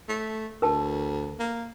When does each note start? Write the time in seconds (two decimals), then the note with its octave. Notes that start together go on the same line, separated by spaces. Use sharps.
0.08 A3
0.62 D2 A#4 A5
1.39 A#3